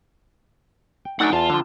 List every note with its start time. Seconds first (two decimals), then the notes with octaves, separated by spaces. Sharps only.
1.05 G5
1.20 F#3 A3 D4 D#4 F#5 G#5
1.33 E2 F4 A5
1.50 D3 F3